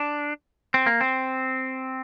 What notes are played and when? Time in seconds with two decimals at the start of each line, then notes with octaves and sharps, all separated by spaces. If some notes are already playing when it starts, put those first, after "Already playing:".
Already playing: D4
0.74 C4
0.87 A#3
1.01 C4